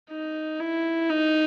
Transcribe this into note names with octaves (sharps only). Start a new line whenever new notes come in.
D#4
E4
D#4